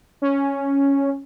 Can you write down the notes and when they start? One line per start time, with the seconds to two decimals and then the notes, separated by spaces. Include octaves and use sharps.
0.22 C#4